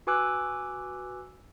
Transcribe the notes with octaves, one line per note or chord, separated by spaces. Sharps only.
F#4 B4 G#5 D6 E6 F#6